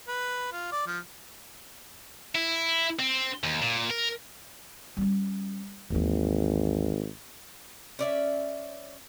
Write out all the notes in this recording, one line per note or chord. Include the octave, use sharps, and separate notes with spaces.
B4
F4
D5
F3
E4
C4
D#2
A#2
A#4
G3 C#4
G#1 D#2 E3
C#4 D5 E5